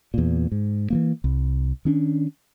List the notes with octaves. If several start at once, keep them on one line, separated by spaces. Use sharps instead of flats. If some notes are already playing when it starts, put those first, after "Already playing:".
E2 A#2
G#2
E3 F3 A#3
C2
D#3 C#4 D4